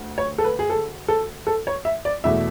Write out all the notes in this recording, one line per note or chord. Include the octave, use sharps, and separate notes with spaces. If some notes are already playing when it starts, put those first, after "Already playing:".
Already playing: D2
C#5
A4
B4
G#4
A4
A4
A4
C#5
E5
D5
E2 B2 A3 E5